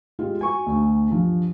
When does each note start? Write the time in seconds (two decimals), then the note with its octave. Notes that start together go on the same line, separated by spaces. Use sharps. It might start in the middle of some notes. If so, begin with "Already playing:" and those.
0.19 G#3 F4 G4
0.41 F#4 G#5 C#6
0.67 D2
1.09 G2 F3